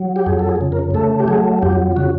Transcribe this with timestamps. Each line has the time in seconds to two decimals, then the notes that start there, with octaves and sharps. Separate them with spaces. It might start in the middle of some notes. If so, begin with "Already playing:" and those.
Already playing: F#3
0.16 G4
0.26 F2 G#4
0.39 A4
0.49 G#4
0.61 C#3
0.72 A#4
0.94 A3 A4
1.20 G4
1.28 F#3 G#4
1.63 F2 G4
1.96 C#3 F#4